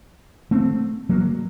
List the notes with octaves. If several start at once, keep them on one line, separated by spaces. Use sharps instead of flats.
A3 C4
F#3 A#3